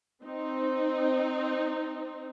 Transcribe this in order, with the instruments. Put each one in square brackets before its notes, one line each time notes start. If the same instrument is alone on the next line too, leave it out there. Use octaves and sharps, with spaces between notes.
[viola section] C4 D#4